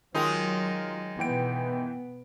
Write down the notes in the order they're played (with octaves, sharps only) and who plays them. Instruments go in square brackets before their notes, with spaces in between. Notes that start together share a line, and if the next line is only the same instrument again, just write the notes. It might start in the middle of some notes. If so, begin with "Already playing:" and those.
[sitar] D#3 G#3 D#4 [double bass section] F#3 [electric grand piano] F4 A#4
[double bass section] B2 B3 [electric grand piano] E3 G5 D7